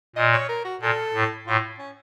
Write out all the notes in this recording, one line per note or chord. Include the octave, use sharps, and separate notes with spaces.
A#2 D#5
C#5
A#4
F#4
A#2 A4
A2
A2 F4
C#4